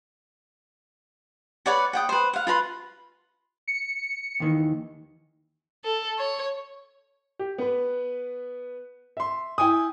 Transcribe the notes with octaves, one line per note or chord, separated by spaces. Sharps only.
B4 C#5 D5 F#5
F#5 G5 D#6
B4 C5
F5 F#5
F4 B4 A#5 C6
C#7
D#2 D#3 E3
A4
C#5
G4
B3 B4
E5 C6
E4 G5 G#5 D#6